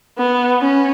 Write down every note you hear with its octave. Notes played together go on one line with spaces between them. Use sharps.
B3
C#4